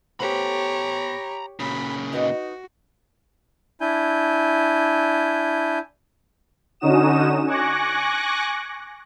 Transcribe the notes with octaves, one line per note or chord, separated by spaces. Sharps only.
A3 B3 G4 C5 C#5 A#5 B5
A#2 C#3 F#3 B5
D#4 F#4 B4 D#5
D4 E4 G#5 G6
D3 C#4 D#4 F#4 D#6 E7
G#5 C#6 D6 F#6 A#6